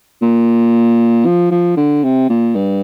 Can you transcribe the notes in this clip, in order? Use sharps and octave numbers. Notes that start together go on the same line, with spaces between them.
A#2
F3
F3
D3
C3
A#2
G2